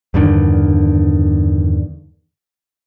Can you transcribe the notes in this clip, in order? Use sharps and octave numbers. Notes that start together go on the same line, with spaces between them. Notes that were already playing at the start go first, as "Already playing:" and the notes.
E2 G2 D3 D#3